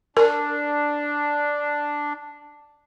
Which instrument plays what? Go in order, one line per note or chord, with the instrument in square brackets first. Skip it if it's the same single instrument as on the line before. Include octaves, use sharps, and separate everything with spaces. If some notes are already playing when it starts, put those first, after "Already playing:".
[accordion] D4 [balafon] A#4